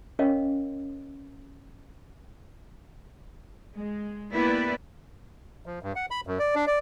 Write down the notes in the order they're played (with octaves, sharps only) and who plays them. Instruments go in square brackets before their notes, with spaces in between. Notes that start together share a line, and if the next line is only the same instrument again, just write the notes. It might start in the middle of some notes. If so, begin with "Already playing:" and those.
[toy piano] C#4 A#4 C#5 D#5 F5
[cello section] G#3
A#3 B3 E4 G4 B4 D5
[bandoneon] F3
G2
F#5
B5
F#2
D5
D4
D5